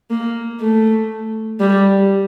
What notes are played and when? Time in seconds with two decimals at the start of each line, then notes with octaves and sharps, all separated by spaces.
0.10 A#3
0.60 A3
1.60 G3